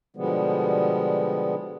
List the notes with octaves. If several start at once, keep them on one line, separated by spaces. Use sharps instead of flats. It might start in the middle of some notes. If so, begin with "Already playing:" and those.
B2 D3 F3 G3 G#3 B3